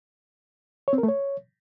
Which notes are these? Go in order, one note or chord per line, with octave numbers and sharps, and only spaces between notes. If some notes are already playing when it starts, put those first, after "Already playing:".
C#5
C4
A#4
A3
C#5